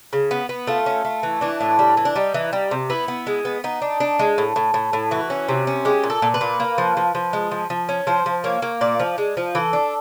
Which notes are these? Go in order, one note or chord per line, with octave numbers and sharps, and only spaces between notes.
C#3
B3
B3
A3 F4
C#4
A3
E3
E3 D4
A2
G3
E3
D4
G3 D#4
E3
G3
C3
B3 E4
B3
G#3
B3
B3 D#4
D4
D4
G#3
A2
A2
A2
A2
E3 F#4
C#4
C3
C#4
G#3 G4
A#2
A4
A#2
B4
A#2
A#3
F3
F3
F3
G#3
F3
F3
C#4
F3 C5
F3
A#3 C#5
A#3
A#2 D5
F3
G#3
F3
E3 A4
D4